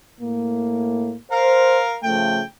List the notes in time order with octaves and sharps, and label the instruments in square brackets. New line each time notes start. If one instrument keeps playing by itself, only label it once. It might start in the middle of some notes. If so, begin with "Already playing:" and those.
[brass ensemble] A2 A#3
[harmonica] A#4 F5 [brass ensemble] C5
[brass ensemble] C#3 F3 A3 [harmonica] G5